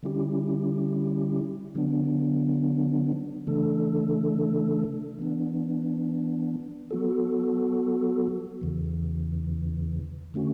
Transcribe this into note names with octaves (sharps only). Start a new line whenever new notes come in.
D3 G3 C#4 E4 G4
D3 F#3 B3 D4
C#3 E3 A3 D4 A4
E3 B3 D4
F#3 B3 F#4 A4
E2 C#3 E3
D3 A3 C#4 F#4